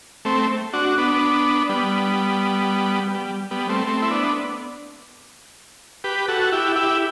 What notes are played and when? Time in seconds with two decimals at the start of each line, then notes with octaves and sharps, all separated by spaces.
0.25 A3 C4
0.73 D4 F#4
0.98 B3 D4
1.69 G3 B3
3.15 G3
3.51 G3 B3
3.69 A3 C4
3.87 A3 C4
4.02 E4
4.11 B3 D4
6.04 G4 B4
6.28 F#4 A4
6.52 E4 G4
6.76 E4 G4